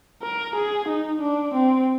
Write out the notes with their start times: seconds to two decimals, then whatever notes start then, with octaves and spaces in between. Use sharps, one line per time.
0.23 A#4
0.55 G#4
0.88 D#4
1.21 D4
1.54 C4